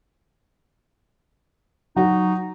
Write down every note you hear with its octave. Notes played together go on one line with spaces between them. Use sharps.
F#3 D#4 F#4